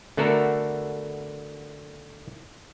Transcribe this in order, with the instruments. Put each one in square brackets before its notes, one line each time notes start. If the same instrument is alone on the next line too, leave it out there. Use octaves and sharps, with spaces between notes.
[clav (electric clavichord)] D3 A3 B3 F#4 A4 A#4